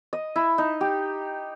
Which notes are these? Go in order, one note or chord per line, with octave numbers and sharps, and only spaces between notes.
D#5
E4
D#4
G4